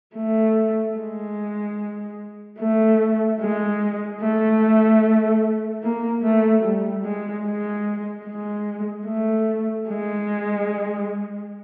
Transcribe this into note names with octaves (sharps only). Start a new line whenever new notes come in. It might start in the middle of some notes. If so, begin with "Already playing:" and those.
A3
G#3
A3
G#3
A3
A#3
A3
G3
G#3
G#3
G#3
A3
G#3